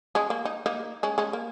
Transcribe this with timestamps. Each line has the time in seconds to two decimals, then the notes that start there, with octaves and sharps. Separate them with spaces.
0.15 G#3 C#4
0.30 A#3
0.45 D#4
0.66 A#3 D#4
1.03 G#3 C#4
1.18 G#3 C#4
1.33 A#3